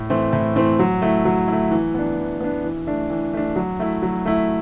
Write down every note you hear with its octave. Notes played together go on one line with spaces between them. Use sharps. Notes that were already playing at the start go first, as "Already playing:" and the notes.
Already playing: A2
E3 A3 C4
A2
E3 A3 C4
F#3
A3 E4
F#3
A3 E4
E3
B3 D4
E3
B3 D4
E3
A3 D4
E3
A3 D4
F#3
A3 E4
F#3
A3 E4